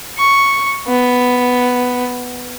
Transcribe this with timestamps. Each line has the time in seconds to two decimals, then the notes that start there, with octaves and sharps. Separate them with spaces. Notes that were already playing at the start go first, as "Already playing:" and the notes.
0.18 C#6
0.88 B3